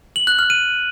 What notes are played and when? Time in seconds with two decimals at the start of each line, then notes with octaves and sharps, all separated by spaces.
0.16 F#7
0.27 F#6
0.39 F6
0.50 D#7